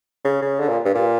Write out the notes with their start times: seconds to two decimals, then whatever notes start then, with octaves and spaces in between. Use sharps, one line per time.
0.24 C#3
0.42 C#3
0.60 D3
0.68 A#2
0.85 G2
0.95 A#2